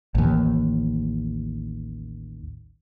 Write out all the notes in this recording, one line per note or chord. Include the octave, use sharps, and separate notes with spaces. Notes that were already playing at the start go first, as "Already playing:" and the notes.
A1 D#2